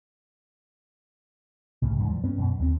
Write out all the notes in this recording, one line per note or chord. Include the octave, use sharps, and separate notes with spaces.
C2 A2 C#3
E2 G#2 C#3
E3 F3 G3
G2 B3 C#4
F#2 B2
D#2 D#3 A3 C4